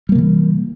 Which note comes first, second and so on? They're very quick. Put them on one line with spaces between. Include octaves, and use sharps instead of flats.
G3 A#3 C3 E3